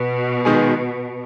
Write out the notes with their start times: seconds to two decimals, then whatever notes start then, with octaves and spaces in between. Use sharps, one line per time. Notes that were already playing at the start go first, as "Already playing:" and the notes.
Already playing: B2
0.45 D#3 G#3 B3 D#4 G#4